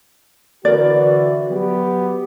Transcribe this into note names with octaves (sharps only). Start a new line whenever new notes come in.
D3 E3 F#4 A#4 D5
F#3 B3 G4